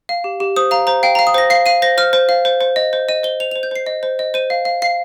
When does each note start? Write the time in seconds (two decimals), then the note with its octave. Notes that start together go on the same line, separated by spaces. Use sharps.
0.09 F5
0.24 G4
0.40 G4
0.56 C5 D#6
0.71 F5 A#5
0.87 C5 A#5
1.03 F5 G5
1.15 F5 A#5
1.27 D#6
1.34 C5 A#6
1.50 F5 C7
1.66 F5 D#7
1.82 C5 A#6
1.98 C5 F6
2.13 C5
2.29 F5
2.45 C5
2.61 C5
2.76 D#5
2.93 C5
3.09 D#5 D#7
3.23 C5 G7
3.40 C5 F7
3.51 C5 F7
3.63 G6
3.71 C5 C7
3.86 D#5
4.03 C5
4.19 D#5
4.34 C5 D#7
4.50 F5
4.65 F5
4.82 F5 C7